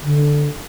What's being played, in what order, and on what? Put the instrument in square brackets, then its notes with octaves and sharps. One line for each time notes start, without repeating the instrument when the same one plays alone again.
[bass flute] D3